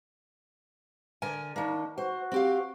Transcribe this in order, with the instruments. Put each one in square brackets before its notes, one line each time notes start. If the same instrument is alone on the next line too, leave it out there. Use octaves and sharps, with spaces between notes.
[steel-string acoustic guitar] D3 A#4 G#5
[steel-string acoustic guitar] D#3 A#3 [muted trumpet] D4
[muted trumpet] F#4 [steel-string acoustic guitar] C5
[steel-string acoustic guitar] C4 G4 F5